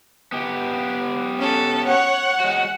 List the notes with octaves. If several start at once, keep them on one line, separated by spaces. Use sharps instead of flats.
B3 G4
C#4 A4
C#5 F#5
G#3 F#4